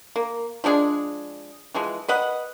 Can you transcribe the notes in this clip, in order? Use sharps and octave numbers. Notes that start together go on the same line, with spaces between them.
A#3
F3 G#3 D4 G#4
E3 F3 G#3
B4 D#5 F#5